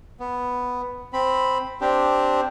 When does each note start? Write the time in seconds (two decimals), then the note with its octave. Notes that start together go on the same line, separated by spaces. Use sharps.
0.20 B3
1.13 C4 B5
1.81 C4 D4 G4